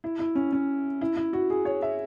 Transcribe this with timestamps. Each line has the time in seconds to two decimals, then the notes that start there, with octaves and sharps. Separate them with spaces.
0.04 E4
0.19 E4
0.35 C#4
0.52 C#4
1.01 E4
1.17 E4
1.33 F#4
1.50 G#4
1.65 C#5
1.82 E5